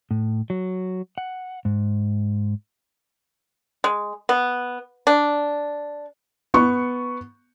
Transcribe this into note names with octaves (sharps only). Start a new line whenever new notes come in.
A2
F#3
F#5
G#2
G#3
B3
D4
B3 C#6